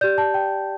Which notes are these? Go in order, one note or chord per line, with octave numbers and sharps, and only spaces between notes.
G4 D5 G6
A5
G5